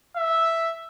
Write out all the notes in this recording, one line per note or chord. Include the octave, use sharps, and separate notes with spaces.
E5